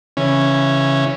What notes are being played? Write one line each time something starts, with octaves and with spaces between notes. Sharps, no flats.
C#3 E3 C#4